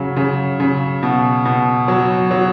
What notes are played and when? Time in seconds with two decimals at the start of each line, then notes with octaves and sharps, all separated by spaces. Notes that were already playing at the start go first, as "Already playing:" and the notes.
Already playing: C#3 F#3
0.17 C#3
0.60 C#3
1.03 B2
1.45 B2
1.88 F#3
2.31 F#3